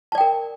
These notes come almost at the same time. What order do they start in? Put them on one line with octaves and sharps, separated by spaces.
A5 D5 G5 A#4